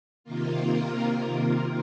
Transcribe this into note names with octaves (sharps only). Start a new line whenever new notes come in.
C3 D#3 A#3 F4
F4 A#4
F4 A#4